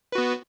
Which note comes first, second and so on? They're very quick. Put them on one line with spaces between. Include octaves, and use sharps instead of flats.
B4 F#4 B3